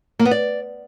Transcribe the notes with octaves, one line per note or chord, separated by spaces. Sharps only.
A#3
B3
D5